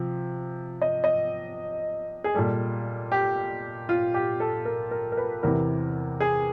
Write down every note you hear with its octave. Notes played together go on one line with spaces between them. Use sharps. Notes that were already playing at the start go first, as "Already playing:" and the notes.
Already playing: C3 F3
D#5
D#5
G#4
A#2 G3 A4
G4
F4
G4
A4
A#4
A#4
A#4
B4
E2 C3 E3 A#4
G#4